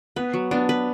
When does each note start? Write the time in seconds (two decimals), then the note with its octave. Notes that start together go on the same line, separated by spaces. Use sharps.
0.16 B3 B4
0.34 F#3
0.51 B3 D4
0.69 B4